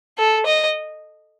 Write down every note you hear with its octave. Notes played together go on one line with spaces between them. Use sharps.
A4
D#5